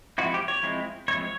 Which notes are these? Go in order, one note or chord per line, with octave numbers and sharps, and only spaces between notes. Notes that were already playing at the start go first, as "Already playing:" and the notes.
F3 G#3 C4 E4 F#4
G4
C#5
F3 G#3 C4 E4
F3 G#3 C4 E4 C#5